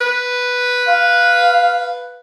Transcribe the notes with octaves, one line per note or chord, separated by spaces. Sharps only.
B4
F5